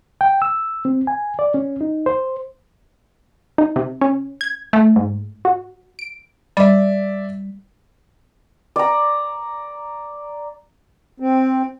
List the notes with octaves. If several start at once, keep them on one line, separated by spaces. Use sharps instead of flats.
G5
E6
C4
G#5
D5
C#4
D#4
C5
D#4
C3
C#4
G#6
A3
G#2
F#4
D7
G3 D5 E5
D5 A#5
C4